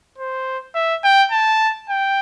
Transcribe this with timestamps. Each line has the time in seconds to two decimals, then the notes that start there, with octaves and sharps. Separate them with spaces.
0.18 C5
0.75 E5
1.04 G5
1.32 A5
1.90 G5